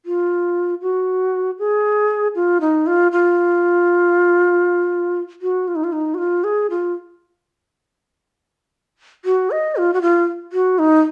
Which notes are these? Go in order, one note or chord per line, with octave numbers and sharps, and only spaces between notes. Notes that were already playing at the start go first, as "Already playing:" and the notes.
F4
F#4
G#4
F4
D#4
F4
F4
F#4
F4
D#4
F4
D#4
F#4
F4
G#4
F4
F#4
D#5
F4
F#4
F4
F#4
D#4